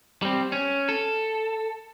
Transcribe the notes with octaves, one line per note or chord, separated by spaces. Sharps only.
G3 C4
C#4
A4